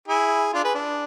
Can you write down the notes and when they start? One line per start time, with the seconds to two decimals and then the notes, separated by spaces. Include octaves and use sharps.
0.08 E4 G#4
0.54 D4 F4
0.64 G#4 B4
0.75 D4